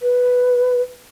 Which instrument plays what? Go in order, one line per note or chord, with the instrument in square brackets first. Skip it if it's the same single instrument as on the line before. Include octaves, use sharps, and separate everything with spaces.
[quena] B4